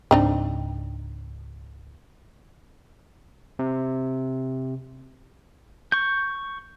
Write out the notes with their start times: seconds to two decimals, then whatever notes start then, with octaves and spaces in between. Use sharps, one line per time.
0.11 C#2 G#2 C4 D4 D#4
3.59 C3
5.92 C#6 G6